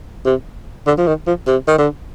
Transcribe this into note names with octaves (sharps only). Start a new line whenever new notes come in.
C3
D3
F3
D#3
F3
C3
D#3
D3